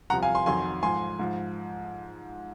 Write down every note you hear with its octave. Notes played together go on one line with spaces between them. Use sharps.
C2 C3 F3 F#5 A#5
F5 G#5
G#5 C6
F2 D#3 F#3 G#5 C6
G#2 F3 G#5 C6
G#2 F3